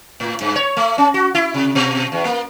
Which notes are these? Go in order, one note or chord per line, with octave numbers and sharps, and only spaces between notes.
A2
G2
C#5
A3
C#4
F#4
E4
C3
B2
E2
A#3